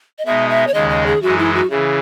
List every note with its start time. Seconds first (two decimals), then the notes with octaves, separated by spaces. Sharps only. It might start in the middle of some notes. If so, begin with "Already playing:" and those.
0.18 D#5
0.26 B2 G#3 D#4 E5
0.49 E5
0.67 C#5
0.74 D#2 C#3 G#3 D#5
0.90 D#5
1.06 G#4
1.22 F#2 E3 G#3 D#4 F#4
1.38 E4
1.55 F#4
1.70 C#3 E3 G#4